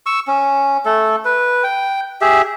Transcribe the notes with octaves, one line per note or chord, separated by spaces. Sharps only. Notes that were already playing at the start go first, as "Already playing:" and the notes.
C#6 E6
C#4
A3 A4
B4
G5
G4 G#4 E5